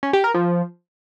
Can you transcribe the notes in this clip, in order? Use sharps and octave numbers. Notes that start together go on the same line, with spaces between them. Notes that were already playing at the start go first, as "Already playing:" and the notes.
C#4
G4
A#4
F3